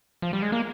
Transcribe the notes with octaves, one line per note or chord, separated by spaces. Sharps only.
F3
G3
G#3
A#3